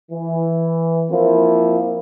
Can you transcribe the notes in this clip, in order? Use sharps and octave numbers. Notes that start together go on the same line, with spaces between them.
E3
F3 A#3 C4 E4